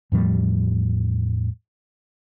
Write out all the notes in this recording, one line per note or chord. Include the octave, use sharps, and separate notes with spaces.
E2 A2 F3 G3